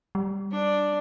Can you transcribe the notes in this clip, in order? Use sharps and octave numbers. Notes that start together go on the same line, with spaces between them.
G3
D4 D5